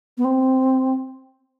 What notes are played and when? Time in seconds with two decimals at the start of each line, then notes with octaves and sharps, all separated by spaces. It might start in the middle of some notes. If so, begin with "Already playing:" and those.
0.18 B3
0.24 C4